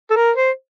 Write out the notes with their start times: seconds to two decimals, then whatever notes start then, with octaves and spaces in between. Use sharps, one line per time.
0.11 A4
0.16 A#4
0.36 C5